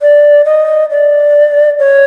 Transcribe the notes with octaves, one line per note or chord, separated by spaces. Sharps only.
D5
D#5
D5
C#5